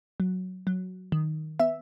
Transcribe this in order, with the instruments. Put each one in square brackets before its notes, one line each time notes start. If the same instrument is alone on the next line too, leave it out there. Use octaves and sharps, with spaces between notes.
[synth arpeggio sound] F#3
F#3
D#3
B3 E5